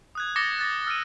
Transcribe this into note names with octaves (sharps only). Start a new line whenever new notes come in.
D#6 F#6 G#6
D6 D#6 A6 A#6 C#7 G7
F#6 A6 A#6
E6 F6 A6 D7 D#7